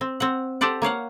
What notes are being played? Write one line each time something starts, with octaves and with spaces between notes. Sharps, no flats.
C4
C4 F#5
G4 A4 C5 D5 F#5
A#3 C#5 F5 F#5